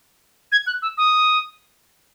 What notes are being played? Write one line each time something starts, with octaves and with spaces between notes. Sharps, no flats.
G#6
F#6
E6
D#6